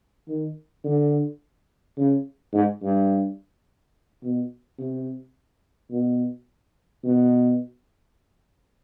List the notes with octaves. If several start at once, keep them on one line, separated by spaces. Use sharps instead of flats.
D#3
D3
C#3
G#2
G2
B2
C3
B2
B2